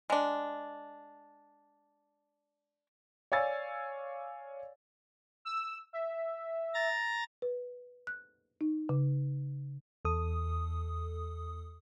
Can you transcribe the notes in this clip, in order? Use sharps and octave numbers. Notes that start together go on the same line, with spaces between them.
G#3 D4
C#5 D5 F5 G#5 E6 A6
E6
E5
A#5 A6
B4
F#6
D#4
C#3
E2 A4 D#6